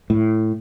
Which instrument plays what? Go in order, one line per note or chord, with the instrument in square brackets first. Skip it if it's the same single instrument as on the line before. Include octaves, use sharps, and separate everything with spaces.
[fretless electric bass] A2